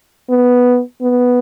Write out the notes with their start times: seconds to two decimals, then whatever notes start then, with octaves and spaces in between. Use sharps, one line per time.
0.30 B3
1.02 B3